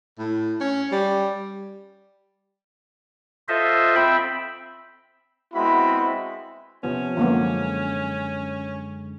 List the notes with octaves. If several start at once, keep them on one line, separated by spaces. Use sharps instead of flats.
A2
C#4
G3
F4 A4 C5 D#5 E5
C4 E5 G5 B5
G#3 B3 C4 E4 F#4 B5
C3 F3 B3 C#4
F#2 D3 F3 G#3 A#3 B3